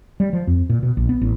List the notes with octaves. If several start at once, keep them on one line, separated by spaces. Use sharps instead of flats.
G3
F3
F2
A#2
B2
A#1
B3
A1